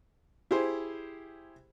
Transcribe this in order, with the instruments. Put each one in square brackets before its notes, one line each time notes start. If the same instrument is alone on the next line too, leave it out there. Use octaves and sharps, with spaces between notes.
[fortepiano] E4 G4 G#4 C5